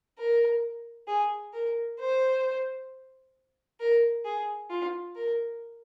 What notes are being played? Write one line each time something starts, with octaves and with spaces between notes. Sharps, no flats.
A#4
G#4
A#4
C5
A#4
G#4
F4
A#4